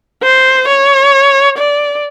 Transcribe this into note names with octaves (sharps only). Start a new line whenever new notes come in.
C5
C#5
D5